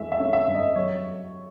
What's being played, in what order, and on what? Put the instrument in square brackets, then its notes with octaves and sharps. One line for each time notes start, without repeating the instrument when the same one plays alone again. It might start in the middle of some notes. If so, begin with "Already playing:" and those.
Already playing: [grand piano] E3 G#3 E5
E5
C#4
E5
G2
D#5
F#3 C#5